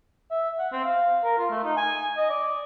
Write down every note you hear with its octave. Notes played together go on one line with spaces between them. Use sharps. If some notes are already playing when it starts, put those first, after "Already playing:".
E5
F#5
C4
F5
A#4
F4
A3
D#4
G#5
D#5
D5